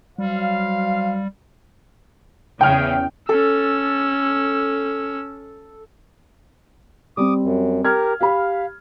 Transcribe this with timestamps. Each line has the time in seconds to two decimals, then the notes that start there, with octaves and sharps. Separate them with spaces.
0.18 F#3 G3 C5 F5
2.61 E2 C#3 G5 F6
3.29 C#4 A4 E6
7.17 G3 C4 D6 D#6
7.43 F#2
7.85 G4 A#4 F6 G#6
8.21 G4 F5 B5